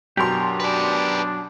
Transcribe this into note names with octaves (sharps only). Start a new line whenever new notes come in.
F#2 B2 D4 G4 A#4 C6
D4 B4 D5